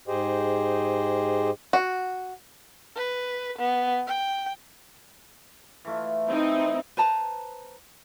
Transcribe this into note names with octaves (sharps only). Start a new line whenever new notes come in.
G#2 G4 G#4 C5 D#5
F#4
B4
B3
G5
E3 A3 F4
C4 D#4 E4
B4 C5 A5 A#5